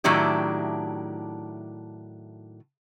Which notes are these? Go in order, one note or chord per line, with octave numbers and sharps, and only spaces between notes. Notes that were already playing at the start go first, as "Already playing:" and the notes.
A2 D#3 F#3 D4 E4 G4